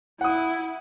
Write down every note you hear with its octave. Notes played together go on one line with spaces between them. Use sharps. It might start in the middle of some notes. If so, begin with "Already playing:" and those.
E4 F#5 D#6